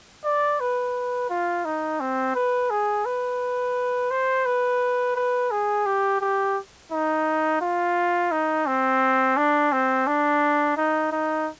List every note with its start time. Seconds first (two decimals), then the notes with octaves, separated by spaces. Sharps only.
0.24 D5
0.60 B4
1.30 F4
1.65 D#4
2.00 C4
2.35 B4
2.70 G#4
3.06 B4
4.11 C5
4.45 B4
5.16 B4
5.51 G#4
5.86 G4
6.21 G4
6.92 D#4
7.61 F4
8.32 D#4
8.67 C4
9.37 D4
9.72 C4
10.07 D4
10.77 D#4
11.12 D#4